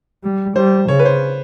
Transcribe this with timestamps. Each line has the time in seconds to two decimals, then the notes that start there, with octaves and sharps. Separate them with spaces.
0.24 G3
0.56 G3 C5
0.88 C#3 C#5
0.99 B4
1.05 C5